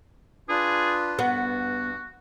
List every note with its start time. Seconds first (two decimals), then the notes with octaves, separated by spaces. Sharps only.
0.49 D4 F4 G#4 B4
1.19 G2 B3 F#4